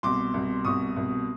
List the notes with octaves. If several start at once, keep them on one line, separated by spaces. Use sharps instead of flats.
C2 B2 C6 D6
C2 B2
C2 B2 C#6 D#6
C2 B2